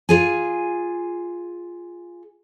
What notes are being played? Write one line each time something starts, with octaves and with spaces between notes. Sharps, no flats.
F4 G#4 G#5